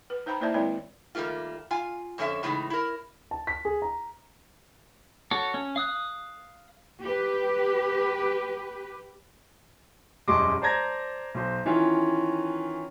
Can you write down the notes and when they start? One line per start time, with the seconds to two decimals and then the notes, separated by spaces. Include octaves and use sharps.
0.10 B4
0.26 D#4 C5 F5 G5 A#5 B5
0.40 A#3 E4 C5 D5 E5 A5
0.54 D#3 G#3 C4 E4 C#5 D5
1.15 D#3 G3 A3 A#3 F4
1.71 F4 F5 G#5
2.18 F2 D3 C#4 A4 E5
2.43 A2 C#3 E3 G#3 A3 D#4
2.70 E4 A#4
3.31 A5
3.47 B6
3.65 G#4
3.82 A#5
5.31 F#4 A4 C#5
5.54 C#4
5.76 F5 D#6 F#6
7.03 G4 B4
10.28 E1 F#2 G3 D#5 C6 D6
10.62 C5 D5 A5 A#5 G#6 A#6
11.34 B1 C5
11.65 D#3 E3 C#4 F4